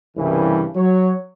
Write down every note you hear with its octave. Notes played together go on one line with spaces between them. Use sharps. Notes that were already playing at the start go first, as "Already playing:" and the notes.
C2 G2 C#3 E3
F#3 C#5